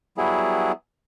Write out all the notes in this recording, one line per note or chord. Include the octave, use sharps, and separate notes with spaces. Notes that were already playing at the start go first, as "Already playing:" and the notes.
F#3 G3 B3 E4 G#4